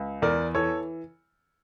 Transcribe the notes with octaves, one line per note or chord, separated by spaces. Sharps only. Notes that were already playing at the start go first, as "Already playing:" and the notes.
Already playing: C#2
E2 A#4 D5
E3 A4 C#5